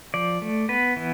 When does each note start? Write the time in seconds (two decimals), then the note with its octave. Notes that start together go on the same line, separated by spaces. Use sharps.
0.14 F3 D5
0.42 A3
0.69 B3 B4
0.97 E3